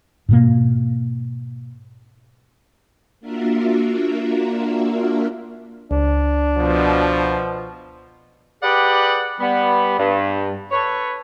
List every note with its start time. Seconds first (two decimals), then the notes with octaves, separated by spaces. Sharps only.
0.29 G#2 B2 A#3
3.20 A#3 D4 F4 F#4 A#4 E5
5.91 C#2 D4
6.57 B2 F3
8.62 G4 G#4 B4 D5 F#5
9.39 G3 B3
9.98 G2
10.71 A4 B4 C#5